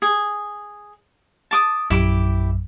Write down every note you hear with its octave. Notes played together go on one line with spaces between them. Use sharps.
G#4
A5 D6 D#6
A#1 F#2 E4 G4 D6